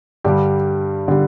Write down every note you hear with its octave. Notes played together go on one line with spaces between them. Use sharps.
G2 D3 G3 G4
D3 G3